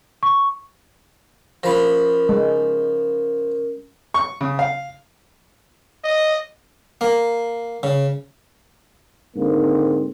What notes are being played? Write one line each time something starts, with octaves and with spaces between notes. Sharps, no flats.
C#6
F3 C#4 A#4 B5
G#3
C#6
C#3
F5
D#5
A#3
C#3
G#2 D3 A#3 C4